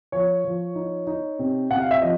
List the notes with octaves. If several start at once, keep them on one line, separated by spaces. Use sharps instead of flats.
F3 C#5
F3
D#4
D#4
C3
C3 F#5
F5
E5
F3 D#5